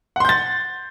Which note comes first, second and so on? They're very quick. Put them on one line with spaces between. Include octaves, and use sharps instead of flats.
F#5 C6 G6 A6